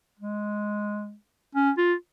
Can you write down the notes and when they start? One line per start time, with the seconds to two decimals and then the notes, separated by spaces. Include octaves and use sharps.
0.19 G#3
1.55 C#4
1.78 F4